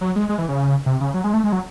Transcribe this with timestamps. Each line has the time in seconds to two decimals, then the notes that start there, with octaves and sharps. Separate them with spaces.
0.01 F#3
0.16 G#3
0.29 G#3
0.38 E3
0.49 C#3
0.86 C3
1.01 C#3
1.14 F#3
1.24 G#3
1.34 A3
1.44 G#3
1.52 F#3